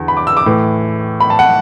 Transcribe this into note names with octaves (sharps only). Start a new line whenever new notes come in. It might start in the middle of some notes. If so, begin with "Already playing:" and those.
Already playing: E2 D3
B5
D6
E6
D6
A2 E3
B5
A5
F#5